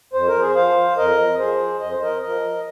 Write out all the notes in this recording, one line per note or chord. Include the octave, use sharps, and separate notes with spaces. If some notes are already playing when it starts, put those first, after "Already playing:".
F2 C5
A#4
G#4 C5
F3 C5 F5
F2 A#4 D#5
F3 G#4 C5
F2 D#5
C5
A#4 D#5
F3 A#4 D#5